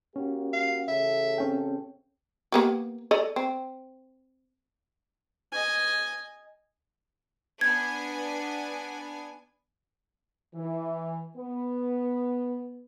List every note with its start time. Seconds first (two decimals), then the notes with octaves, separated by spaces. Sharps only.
0.16 A#3 C#4 F#4 G4
0.53 F5
0.88 A1 C#3 A4 E5
1.38 C4 C#4 G5
2.52 A#3 B3 G4
3.11 A4 D5 D#5
3.36 C4
5.52 D#5 G#5
7.61 B3 D4 G#5 G#6
10.55 E3
11.37 B3